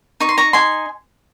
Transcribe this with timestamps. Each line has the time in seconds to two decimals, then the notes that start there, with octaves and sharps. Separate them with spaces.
0.20 D#4 C#6
0.29 C6
0.38 A#5 C#6
0.53 D#4 G#5 C6